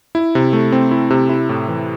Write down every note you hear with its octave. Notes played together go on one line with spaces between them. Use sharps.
E4
C3
A3
C4
E4
C3
E4
A2
E3